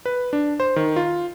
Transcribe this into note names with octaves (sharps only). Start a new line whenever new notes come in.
B4
D4
C5
D#3
F4